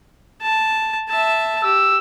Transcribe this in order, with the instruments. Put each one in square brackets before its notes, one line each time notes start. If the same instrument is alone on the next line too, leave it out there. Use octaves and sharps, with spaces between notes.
[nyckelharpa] A5
E5 A5
[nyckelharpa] G4 [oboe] E6